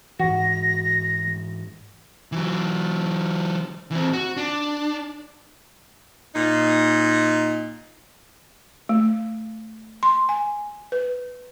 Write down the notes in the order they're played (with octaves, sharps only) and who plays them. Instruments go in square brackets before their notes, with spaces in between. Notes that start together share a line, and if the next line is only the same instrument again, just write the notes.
[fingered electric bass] G#2 E3 [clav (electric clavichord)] F#4 [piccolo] A#6
[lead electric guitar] E3 F#3
E3 C4
F#4
D4
[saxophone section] A#2 D#4
[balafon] A3
C6
G#5
B4